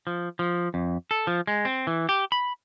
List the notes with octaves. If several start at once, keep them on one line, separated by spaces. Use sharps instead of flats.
F3
F3
F2
A4
F3
G#3
C4
E3
G4
B5